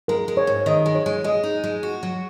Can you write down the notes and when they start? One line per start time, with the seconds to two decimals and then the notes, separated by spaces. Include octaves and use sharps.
0.08 G#3 A#4
0.28 G#3
0.37 C#5
0.47 G#2
0.66 D#3 D#5
0.86 G#3
0.95 C#5
1.06 G#3
1.24 G#3 D#5
1.43 D#4
1.64 G#3
1.83 F#4
2.03 F#3